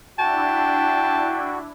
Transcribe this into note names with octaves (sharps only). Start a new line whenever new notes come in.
D4 E4 F#4 G5 A5